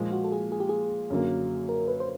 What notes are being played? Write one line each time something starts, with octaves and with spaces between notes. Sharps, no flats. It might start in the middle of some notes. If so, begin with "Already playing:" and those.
Already playing: A#2 F3 G#3
F#4
A4
G#4
G#4
G4
G#4
F#2 D3 F#3 A#3
A#4
B4
C5